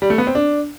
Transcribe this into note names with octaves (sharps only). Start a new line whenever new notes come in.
G3
A3
B3
C4
D4